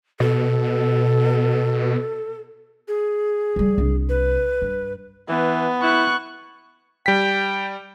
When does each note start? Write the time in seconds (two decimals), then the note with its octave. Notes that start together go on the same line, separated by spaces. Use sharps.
0.20 B2 A4
2.88 G#4
3.56 F3 G3
3.78 C2 D4
4.09 B4
4.62 G2
5.29 E3 B3
5.83 E4 C#6 F#6
7.06 G3 G5 B6